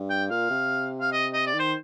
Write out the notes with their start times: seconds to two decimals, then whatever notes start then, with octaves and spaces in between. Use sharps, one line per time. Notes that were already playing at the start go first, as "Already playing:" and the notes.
Already playing: G2
0.10 G5
0.30 A#2 F5
0.50 C3
1.01 F5
1.12 D#5
1.33 D#5
1.47 D5
1.54 D#3
1.59 C5